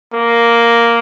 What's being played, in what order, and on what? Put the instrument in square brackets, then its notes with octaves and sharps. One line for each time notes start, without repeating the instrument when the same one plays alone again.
[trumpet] A#3